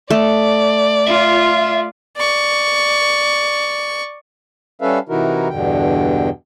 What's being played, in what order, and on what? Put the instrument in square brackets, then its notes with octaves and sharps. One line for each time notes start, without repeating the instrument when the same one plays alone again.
[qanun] A3 [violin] D5
[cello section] F4 [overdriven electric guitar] E5
[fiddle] D5 C#6
[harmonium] G3 C#4 A4 B4 E5 F5
C3 E3 D#4 E4 F#4 A#4
E2 G2 B2 D3 G5